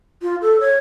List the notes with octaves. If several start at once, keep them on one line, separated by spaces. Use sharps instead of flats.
F4
A4
C#5